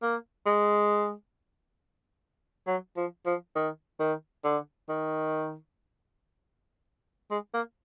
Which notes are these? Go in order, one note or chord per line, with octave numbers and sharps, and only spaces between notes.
A#3
G#3
F#3
F3
F3
D#3
D#3
D3
D#3
G#3
A#3